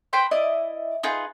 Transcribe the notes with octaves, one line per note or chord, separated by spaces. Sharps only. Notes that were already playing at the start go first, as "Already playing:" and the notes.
B4 C5 G5 C6
E4 D5 D#5
D#4 F4 G#4 B4